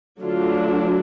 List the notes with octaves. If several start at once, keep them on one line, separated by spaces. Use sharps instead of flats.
D3 F#3 A3 D4 F4